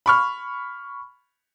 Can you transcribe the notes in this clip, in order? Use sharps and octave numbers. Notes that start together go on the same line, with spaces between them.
B5 C#6 F6